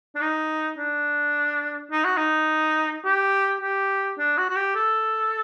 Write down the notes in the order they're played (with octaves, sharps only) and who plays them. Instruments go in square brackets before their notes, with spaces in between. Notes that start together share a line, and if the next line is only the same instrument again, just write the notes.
[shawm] D4
D#4
D4
D#4
F#4
D#4
G4
G4
D4
F#4
F#4
G4
A4